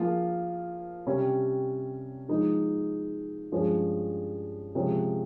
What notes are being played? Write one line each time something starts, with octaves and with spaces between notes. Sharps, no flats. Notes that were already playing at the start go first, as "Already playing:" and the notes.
Already playing: F3 A#3 F4 G#4 C5
C3 G3 C#4
F3 G#3 D#4
G2 F3 G#3 C#4 G#4
C3 F3 G#3 C#4